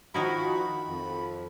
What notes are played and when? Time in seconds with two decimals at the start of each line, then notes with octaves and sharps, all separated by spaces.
0.14 D#3 F3 D#4 E4 F#4 B5
0.89 F2